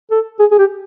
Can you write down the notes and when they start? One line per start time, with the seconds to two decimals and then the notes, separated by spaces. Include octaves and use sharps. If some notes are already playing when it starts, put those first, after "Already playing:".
0.11 A4
0.39 G#4
0.51 G#4
0.59 G4